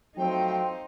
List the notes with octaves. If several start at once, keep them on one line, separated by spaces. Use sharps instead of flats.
F3 F#3 A3 C4 D#4 C5 G5